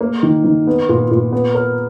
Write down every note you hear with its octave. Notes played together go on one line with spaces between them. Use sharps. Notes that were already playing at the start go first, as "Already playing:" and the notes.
A#3
D#3
D#3
B3
A#2
A#2
B3
A#4